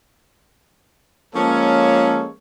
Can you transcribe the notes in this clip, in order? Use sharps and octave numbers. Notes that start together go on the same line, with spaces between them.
F3 G#3 A#3 C#4 A4 C#5